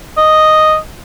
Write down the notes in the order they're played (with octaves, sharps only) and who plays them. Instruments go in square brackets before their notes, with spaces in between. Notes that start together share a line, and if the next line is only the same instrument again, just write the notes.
[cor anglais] D#5